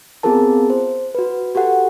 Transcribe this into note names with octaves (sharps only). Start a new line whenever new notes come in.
B3 C4 F4 G#4 A#4 A5
C5
F#4 B4
F#4 G4 A4 F#5